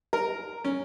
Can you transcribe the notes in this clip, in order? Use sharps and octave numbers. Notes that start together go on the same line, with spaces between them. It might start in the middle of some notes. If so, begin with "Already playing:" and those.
A#4
C#4